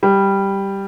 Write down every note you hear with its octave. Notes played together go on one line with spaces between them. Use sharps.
G3